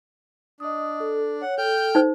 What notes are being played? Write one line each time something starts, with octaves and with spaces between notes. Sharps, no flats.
D4 D#5 D#6
A4
C#5 F#5
A4 G5 F6 G6
D#4 C5